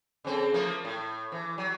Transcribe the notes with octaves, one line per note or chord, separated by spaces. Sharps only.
C#3 C4 A4
F3 A3 A#3
A2
E3
F#3